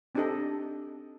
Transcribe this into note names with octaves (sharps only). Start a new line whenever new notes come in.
C4 D4 D#4 G4 A4 D#5